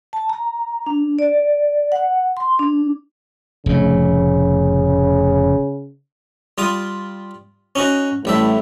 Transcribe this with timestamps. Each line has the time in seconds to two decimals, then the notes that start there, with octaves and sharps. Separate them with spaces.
0.13 A5
0.29 A#5
0.86 D4
1.19 D5
1.92 F#5
2.37 C6
2.59 D4
3.66 F1 A2 C#3
6.58 G3 F4 D#6
7.75 C#4 D#4 F#4
8.25 A1 A2 G3 E5